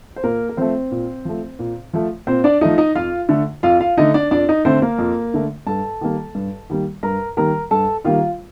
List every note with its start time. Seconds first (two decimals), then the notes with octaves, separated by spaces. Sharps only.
0.16 C5
0.24 A#2 A#3 A#4
0.49 A#4
0.57 F3 A3 C4 C5
0.91 A#2
1.25 F3 A3
1.59 A#2
1.93 F3 A3
2.27 A#2 C4 C5
2.44 D4 D5
2.61 F3 A3 D#4 D#5
2.78 D#4 D#5
2.95 F2 F4 F5
3.29 D3 A3
3.63 F2 F4 F5
3.80 F4 F5
3.97 D3 A3 D#4 D#5
4.14 D4 D5
4.31 F2 D4 D5
4.49 D#4 D#5
4.65 D3 A3 C4 C5
4.82 A#3 A#4
4.99 F2
5.34 D3 A3
5.67 G2 A4 A5
6.01 D#3 G3 A#3
6.35 G2
6.70 D#3 G3 A#3
7.03 G2 A#4 A#5
7.37 D#3 G3 A#3 A#4 A#5
7.71 G2 A4 A5
8.05 D#3 G3 A#3 F4 F5